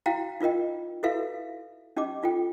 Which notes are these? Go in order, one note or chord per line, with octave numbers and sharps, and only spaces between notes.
E4 F#4 F5 G5 A#5
D#4 F4 A#4 D#5 G5
E4 F#4 A4 B4 E5 F5
C#4 D#4 G4 D#5 D6
D#4 F4 A4 G5